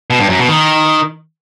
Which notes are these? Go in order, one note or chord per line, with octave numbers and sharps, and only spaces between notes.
B2
G2
F#2
B2
D#3